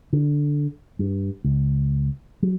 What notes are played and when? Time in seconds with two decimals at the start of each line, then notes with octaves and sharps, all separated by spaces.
0.13 D3
0.99 G2
1.44 C#2
2.43 F#3